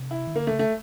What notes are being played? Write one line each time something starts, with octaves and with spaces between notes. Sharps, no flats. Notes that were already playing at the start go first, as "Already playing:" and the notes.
Already playing: C3
E4
D#3
D3 A#3
A3
C#3
A3